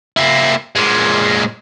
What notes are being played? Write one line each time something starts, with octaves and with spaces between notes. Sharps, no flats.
A#3 E4
A#2 G#3